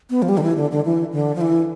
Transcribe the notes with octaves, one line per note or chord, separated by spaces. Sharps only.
B3
F3
G3
D3
E3
D3
D3
E3
D3
F3
E3